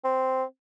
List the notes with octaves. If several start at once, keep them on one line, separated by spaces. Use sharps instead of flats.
C4